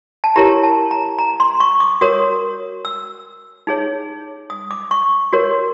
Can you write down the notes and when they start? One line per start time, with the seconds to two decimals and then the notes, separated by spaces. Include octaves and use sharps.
0.24 A5
0.36 E4 G4 A#4 C#5 A#5
0.63 A5
0.91 A#5
1.18 A#5
1.40 C6
1.60 C#6
1.80 D6
2.01 F#4 A#4 C#5 D#6
2.85 E6
3.67 D#4 G#4 C#5
4.50 D#6
4.71 D6
4.91 C#6
5.33 F#4 A#4 C#5